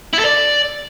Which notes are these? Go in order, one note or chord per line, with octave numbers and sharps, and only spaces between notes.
E4
A4
D5